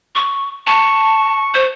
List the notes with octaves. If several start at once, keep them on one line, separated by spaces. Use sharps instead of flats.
C#6
A5 C#6
C5